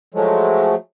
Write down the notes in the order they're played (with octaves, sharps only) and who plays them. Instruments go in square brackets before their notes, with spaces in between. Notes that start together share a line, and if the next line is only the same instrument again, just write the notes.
[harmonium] F3 F#3 G#3 A3